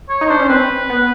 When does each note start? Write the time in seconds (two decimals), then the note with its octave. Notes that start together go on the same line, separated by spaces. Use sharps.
0.09 C#5
0.21 D#4
0.30 D4 C5
0.40 C#4
0.49 C4 B4
0.90 B3